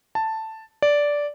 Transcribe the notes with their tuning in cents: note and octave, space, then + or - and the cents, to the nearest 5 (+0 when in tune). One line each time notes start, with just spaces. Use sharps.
A5 +5
D5 -10